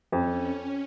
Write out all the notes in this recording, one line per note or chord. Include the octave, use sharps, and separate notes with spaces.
F2 C#4